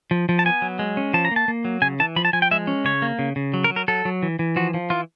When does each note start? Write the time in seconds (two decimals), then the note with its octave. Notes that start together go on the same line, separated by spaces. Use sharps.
0.11 F3
0.29 F3
0.39 A5
0.45 B3 G#5
0.62 F#3
0.79 G#3
0.97 C#4
1.14 F3 A5
1.25 A#5
1.31 A#3 A5
1.48 A#3
1.65 F#3
1.82 C#3 G#5
2.00 E3 A5
2.16 F3 B5
2.25 A5
2.33 F3 G#5
2.42 G5
2.51 G#3 E5
2.67 C#4
2.84 C#3 C#5
3.02 A#3
3.19 C#3
3.36 C#3
3.54 F#3
3.64 A#4
3.70 F#3
3.76 A#4
3.88 F#3 A4
4.05 F#3
4.22 E3
4.39 E3
4.56 F3 F#4
4.74 F3
4.90 E3 F4